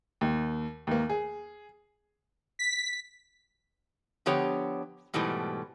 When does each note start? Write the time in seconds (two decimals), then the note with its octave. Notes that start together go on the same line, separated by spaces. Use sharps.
0.21 D#2
0.87 D#2 A#3
1.10 G#4
2.59 B6
4.26 D3 F3 B3 G4 C#5
5.14 G#2 B2 E3 G3 A3